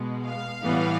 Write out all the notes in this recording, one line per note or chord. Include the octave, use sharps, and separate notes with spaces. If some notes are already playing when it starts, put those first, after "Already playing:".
Already playing: B2 G#3 B3
F5
A2 E3 G3 B3